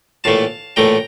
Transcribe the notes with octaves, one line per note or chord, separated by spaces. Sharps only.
A#1 A2 E3 A3 F5 A5
A#1 A2 E3 A3 G5 A#5